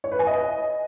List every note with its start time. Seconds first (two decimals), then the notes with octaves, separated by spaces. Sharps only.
0.04 C#5
0.12 B4
0.19 G#5
0.27 D#5